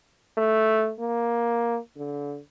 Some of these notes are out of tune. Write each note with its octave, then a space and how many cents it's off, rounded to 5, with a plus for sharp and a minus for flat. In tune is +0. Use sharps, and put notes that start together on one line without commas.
A3 -5
A#3 +10
D3 -30